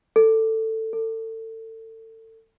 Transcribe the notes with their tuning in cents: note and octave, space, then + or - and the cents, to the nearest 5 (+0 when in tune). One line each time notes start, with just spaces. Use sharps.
A4 +15
A4 +30